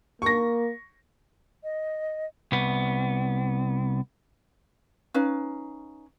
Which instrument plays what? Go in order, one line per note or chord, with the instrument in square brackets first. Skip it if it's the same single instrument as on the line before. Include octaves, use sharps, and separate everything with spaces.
[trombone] A#3 [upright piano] C#6 A#6
[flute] D#5
[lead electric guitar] C2 B3
[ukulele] C#4 D#4 B4 F5